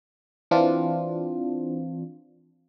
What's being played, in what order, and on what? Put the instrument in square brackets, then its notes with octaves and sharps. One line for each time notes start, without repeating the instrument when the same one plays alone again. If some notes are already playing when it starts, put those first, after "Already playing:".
[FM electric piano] E3 C4 D4 F4